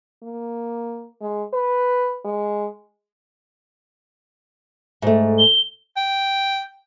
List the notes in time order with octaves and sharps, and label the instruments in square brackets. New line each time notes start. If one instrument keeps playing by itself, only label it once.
[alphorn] A#3
G#3
B4
G#3
[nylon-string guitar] G#2 A3
[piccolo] G7
[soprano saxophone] G5